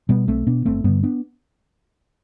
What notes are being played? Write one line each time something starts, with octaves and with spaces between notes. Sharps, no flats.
B2 G3 B3
B1 A3 C4
B2 B3 D4
G1 A3 C4
G2 D3 G3 B3
B3 D4